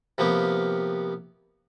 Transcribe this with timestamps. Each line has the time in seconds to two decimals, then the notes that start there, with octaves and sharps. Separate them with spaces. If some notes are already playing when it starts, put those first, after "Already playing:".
0.18 C3 F3 A#3 B3 G4